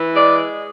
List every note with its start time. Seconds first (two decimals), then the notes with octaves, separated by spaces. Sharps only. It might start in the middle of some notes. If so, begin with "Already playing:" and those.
Already playing: E3
0.14 G#3 D5